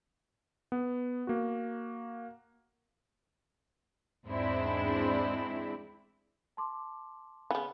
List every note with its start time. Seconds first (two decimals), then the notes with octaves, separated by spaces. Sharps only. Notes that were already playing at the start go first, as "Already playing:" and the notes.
0.72 B3
1.27 A#3 F#4
4.26 E2 G#2 G#3 C4 D4 E4
6.57 A5 C6 D6
7.51 C#3 E3 B3